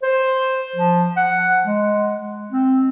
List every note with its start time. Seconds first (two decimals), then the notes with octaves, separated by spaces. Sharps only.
0.03 C5
0.76 F3
1.17 F#5
1.66 G#3
2.51 C4